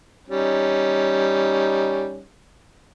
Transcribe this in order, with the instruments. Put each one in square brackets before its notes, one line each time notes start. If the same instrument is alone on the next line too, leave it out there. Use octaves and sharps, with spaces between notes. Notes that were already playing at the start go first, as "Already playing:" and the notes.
[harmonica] G3 C#4 D#4